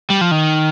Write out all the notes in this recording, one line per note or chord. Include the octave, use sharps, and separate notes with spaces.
G3
F3
D#3